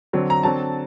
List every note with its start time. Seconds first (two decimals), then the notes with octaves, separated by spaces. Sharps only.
0.13 D3 F#3 C4
0.30 A#5
0.43 D3 F#3 C4 A5